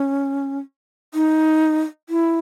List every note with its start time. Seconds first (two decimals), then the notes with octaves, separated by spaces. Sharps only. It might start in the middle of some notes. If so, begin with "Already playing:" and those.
Already playing: C#4
1.14 D#4
2.09 E4